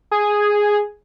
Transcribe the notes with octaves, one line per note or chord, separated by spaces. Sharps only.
G#4